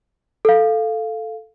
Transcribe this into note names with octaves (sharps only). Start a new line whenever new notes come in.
A4 F5